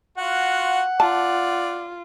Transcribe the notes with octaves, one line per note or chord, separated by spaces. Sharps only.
F4 F#4 F#5
F4 D5 A5